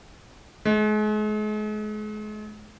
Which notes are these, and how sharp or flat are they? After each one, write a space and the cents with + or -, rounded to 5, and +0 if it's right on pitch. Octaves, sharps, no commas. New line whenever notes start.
G#3 +40